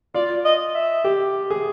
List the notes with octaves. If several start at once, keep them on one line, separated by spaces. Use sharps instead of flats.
F4 D5
D#5
E5
G4
G#4